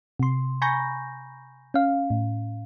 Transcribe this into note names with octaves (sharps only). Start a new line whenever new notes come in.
C3 C6
G#5 A#5 B5 C#6 G6 A#6
C#4 F5
A2